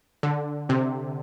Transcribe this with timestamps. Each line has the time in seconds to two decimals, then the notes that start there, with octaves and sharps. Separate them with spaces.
0.23 D3
0.69 C3